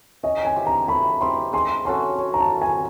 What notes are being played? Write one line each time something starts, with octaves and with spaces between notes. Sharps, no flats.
C#4 D#5
G#5
E4 G4 C5
A#5
A3 B5
C4 E4 G4 C6
G#3 C6
C#4 F#4 A4 C6
C#4
A#5
A5
E4 A4
G#5